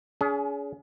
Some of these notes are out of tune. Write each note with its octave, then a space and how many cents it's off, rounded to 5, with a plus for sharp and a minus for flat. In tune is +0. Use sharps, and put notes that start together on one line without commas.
C#4 +45 G#4 +15